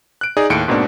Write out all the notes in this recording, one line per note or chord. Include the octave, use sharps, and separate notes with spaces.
F#6 D7
D#4 G#4 D5
D#2 A2 C#7 D7
G#2 B2 A#3 C4 D4